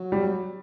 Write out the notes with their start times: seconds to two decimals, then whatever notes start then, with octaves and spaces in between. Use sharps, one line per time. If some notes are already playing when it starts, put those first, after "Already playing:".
Already playing: F#3
0.12 G3